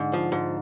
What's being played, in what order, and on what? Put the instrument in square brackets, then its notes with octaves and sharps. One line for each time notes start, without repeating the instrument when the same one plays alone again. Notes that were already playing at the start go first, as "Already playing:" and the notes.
Already playing: [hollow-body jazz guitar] G#2 [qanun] D3
[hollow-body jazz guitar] F3
G#2